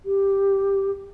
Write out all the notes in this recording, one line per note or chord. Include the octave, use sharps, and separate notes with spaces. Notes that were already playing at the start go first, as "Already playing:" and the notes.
G4